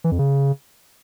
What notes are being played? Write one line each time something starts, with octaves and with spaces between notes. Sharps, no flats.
E3
F2
C#3